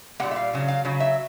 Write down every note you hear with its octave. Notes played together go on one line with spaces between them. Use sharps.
A#2 G3 A#3 F#5
E5
F5
C#3 F#3
F5
C#3 F#3
E5